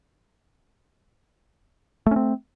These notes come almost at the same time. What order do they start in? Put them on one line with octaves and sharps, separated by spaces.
A3 C#4 C4